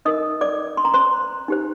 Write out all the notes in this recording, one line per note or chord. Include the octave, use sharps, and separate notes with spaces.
D#4 A#4 D#5 D#6
D5 D6
C6
A#5
C5 C6
D#4 G4 C5